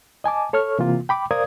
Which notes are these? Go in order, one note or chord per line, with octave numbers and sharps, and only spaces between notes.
D#5 G#5 A5 D6
A4 C#5 C#6 F6
C3 E3 A#3 F4
G5 B5 D6
A#4 C5 D5 F5 D#6 G#6